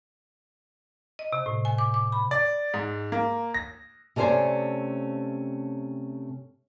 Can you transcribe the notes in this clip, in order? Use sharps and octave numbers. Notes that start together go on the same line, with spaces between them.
D#5
C3
A2
G#5
D6
D6
B5
D5
G#2
A#3
A#6
C3 A3 C#4 D4 C5 G#5